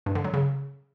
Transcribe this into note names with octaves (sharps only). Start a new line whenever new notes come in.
G2
D3
F#3
C#3